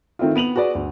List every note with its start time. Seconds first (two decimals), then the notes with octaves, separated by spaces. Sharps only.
0.19 D#3 A3 C4 E4 F4
0.36 B3 D#7 F7 F#7
0.56 F#4 G#4 B4 D5
0.75 D2